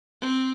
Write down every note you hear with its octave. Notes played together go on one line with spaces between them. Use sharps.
C4